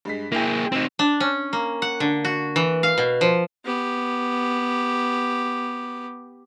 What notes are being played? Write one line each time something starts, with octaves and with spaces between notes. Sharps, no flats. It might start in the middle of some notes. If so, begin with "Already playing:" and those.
G2 G#3 B6
A#3 E4 G#4 G5
F1 C4 D#4 E7
D4
C#4
A#3
F#5
D3
F#4
E3
F5
B2
F3
B3 G4